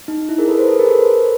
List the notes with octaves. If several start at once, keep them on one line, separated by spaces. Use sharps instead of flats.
D#4
E4
G#4 A#4
A4 B4
A#4 C5
A4 B4
G#4 A#4
A4 B4
A#4 C5